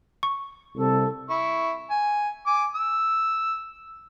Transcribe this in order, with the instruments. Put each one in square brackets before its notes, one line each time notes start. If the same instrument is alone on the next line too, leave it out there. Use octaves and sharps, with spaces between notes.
[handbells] C#6
[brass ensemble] C2 [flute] A4
[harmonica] E4 C#6
G#5
G#5 D6
E6